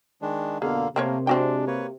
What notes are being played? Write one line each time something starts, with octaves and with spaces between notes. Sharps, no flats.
D#3 G#3 D4
F2 B2 D3 A#3 G#4 F5
C3 A3 A#3 C4 A#4 C#5
G#3 C4 D4 F#4 G5
A#3 B4 C#5